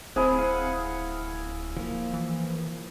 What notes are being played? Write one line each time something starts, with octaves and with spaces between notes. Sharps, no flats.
D1 C4 E4 G#4 C5
F5 F#5
F3 A#3
E3